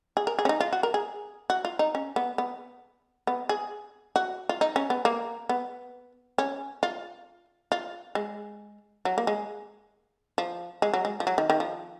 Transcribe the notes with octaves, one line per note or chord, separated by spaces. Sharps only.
G#4
A#4
G#4
C#4
D#4
F4
F#4
A#4
G#4
F#4
F4
D#4
C#4
B3
B3
B3
G#4
F#4
F4
D#4
C#4
B3
A#3
B3
C#4
F4
F4
G#3
F#3
A#3
G#3
F3
G#3
F#3
G#3
F3
F#3
D#3
D#3
F3